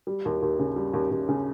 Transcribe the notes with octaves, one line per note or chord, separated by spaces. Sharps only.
G3
D#2
D#2
C#3
G3
D#2
D#2
C#3